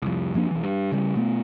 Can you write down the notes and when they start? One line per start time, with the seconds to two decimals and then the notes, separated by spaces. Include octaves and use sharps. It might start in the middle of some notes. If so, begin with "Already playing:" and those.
0.02 C2 F2
0.34 F#2 F3 A#3 D4
0.51 B1 E3
0.63 G2
0.92 C#3 G3
1.15 B2 A3 B3